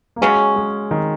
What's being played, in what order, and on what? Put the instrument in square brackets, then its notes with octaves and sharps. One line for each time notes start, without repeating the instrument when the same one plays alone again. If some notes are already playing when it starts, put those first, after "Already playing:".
[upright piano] A#3
[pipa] C#3 F#3 C#4 [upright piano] G#3
[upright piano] G#3
D#3